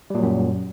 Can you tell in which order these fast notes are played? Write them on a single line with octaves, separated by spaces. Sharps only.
G3 A#2 F#3 F#2